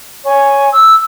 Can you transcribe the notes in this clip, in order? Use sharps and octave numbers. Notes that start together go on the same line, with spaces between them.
C#5 G#5 C#6
E6